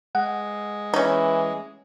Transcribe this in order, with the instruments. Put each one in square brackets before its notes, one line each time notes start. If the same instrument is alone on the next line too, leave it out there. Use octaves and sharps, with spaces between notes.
[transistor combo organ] G#3 [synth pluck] F#5
[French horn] E3 [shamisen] C#4 D#4